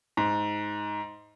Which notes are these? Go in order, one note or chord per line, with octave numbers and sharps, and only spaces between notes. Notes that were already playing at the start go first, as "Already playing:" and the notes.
G#2